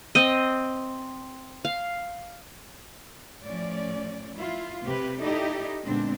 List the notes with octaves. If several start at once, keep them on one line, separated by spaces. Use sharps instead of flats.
C4 D#5
F5
A2 F3 C#4 D5
E4 F4
C3 C4 G4 B4
D#4 E4 G4 A4 D5 D#5
A#2 D3 G#3 B3 C4 D4